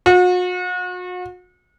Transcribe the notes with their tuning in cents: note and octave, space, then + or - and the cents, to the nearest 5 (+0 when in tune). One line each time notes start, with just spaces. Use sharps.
F#4 -40